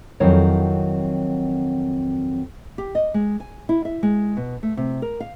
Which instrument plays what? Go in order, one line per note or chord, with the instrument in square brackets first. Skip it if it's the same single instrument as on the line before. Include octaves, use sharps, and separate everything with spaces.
[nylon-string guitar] F2 D#3 F#3 C4 E4 C#5
G4
D#5
G#3
G#5
E4
E5
G#3
B2
A3
C3
A#4
F5